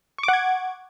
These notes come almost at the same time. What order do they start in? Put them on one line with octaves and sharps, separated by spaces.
C#6 D6 F#5 G#6